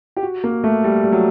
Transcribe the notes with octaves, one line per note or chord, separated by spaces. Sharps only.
G4
F#4
A#3
A3
G3
G3
F#3